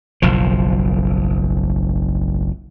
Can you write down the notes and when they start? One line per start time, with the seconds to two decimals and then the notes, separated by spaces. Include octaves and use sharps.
0.22 F#1 B1 F3